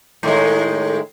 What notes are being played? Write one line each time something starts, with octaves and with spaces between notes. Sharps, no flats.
A2 D#3 G#3